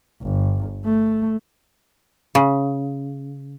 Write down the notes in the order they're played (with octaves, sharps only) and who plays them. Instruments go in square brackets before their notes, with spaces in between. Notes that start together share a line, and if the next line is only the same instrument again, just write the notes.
[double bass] G1
A3
[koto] C#3